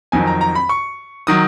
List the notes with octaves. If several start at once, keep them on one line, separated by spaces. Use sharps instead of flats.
F2 D#3 F#3 G#5
A#5
A#5
B5
C#6
D#3 F#3 D#6